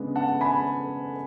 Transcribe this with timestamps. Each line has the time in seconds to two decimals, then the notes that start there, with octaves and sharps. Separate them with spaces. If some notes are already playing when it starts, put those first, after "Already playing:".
Already playing: C#3 G#3 B3 D4
0.16 F#5 A5
0.41 G#5 B5